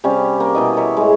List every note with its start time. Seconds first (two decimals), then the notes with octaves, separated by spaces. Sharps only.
0.04 C3 G3 C#4 F5
0.40 A#3
0.55 B2 E3 D#5
0.77 A#4 C#5 E5
0.97 A2 G#3